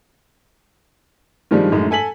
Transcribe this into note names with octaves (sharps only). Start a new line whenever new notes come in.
G2 D#3 F3 G3 G#3
F#2 A2 D3 G#3 D#4
A4 G#5 B6 F#7